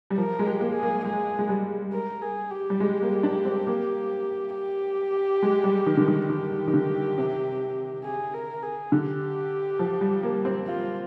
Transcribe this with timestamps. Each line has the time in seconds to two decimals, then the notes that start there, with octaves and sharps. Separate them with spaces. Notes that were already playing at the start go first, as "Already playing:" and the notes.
0.10 G3
0.18 F3 A#4
0.39 G#3
0.46 G4
0.61 A#3
0.75 G#4
0.83 A#3
1.05 G#3 G#4
1.39 G#3
1.49 G3
1.93 A#4
2.22 G#4
2.51 G4
2.70 G3
2.80 G#3
3.02 A#3
3.23 D4
3.45 C4
3.67 A#3
4.55 G4
5.42 G#3
5.64 G3
5.86 D#3
5.97 D3
6.08 D#3
6.29 D#3 G4
6.68 D#3
6.74 D3
7.18 C3
8.04 G#4
8.34 A#4
8.63 G#4
8.92 D3 G4
9.79 F3
10.01 G3
10.23 A#3
10.45 C4
10.67 F4